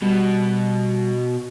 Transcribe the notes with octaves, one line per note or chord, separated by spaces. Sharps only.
B2 G3